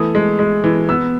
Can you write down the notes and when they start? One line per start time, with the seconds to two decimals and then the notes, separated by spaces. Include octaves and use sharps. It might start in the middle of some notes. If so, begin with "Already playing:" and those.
Already playing: E3 A3 D#6
0.15 G#3
0.39 G#3
0.64 E3
0.89 B3 E6